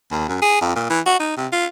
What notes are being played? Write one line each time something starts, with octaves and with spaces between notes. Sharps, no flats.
D#2
F#2
G#4
F2
A#2
E3
F#4
D#4
C3
F4